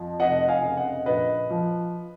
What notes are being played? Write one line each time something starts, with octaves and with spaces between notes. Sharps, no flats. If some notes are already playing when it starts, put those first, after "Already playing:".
Already playing: F2 F3
F1 D#5 F#5
F5 G#5
C#3
D#5 F#5
A#1 B4 D#5
F3